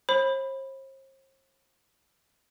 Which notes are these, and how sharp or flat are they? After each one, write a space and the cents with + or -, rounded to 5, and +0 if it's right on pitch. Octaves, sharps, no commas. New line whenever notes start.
C5 +40 B5 +0